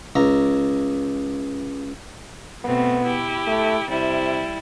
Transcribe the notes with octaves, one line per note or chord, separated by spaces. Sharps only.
C#2 A#5
B2 A3 B3 C4
E4 G4
A3
C3 G3 E4